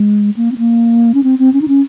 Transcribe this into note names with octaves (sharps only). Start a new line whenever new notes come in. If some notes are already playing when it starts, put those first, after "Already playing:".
Already playing: G#3
A#3
C4
A#3
C#4
C4
C4
C#4
D#4
C#4